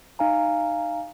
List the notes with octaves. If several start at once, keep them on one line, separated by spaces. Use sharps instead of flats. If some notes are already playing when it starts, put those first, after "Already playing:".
D#4 F5 G#5 A#5